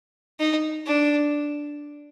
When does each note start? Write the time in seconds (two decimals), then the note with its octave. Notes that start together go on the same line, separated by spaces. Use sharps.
0.40 D#4
0.86 D4